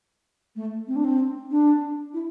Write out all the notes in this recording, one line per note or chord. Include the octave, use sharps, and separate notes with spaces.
A3
C4
D4
C4
D4
E4